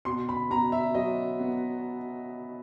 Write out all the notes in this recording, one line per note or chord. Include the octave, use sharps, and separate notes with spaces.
B2 C6
B5
B2 A#5
E5
F#3 D#5
B3